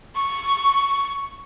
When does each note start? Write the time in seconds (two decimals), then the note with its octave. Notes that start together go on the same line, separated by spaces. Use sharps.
0.15 C#6